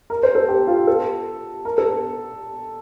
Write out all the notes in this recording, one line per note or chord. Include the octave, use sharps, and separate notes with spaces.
A#4
C5
A4
G4
F4
A4
A#4
A4